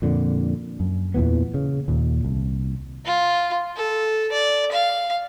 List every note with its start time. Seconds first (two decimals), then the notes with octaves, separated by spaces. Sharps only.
0.02 F2 A#2 D3
0.80 F#2
1.14 E2 A#2 E3 B3
1.54 C#3
1.88 D#2 A#2
2.25 C2
3.05 F4
3.76 A4
4.32 D5
4.72 F5